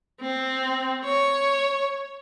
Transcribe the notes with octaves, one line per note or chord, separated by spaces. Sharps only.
C4
C#5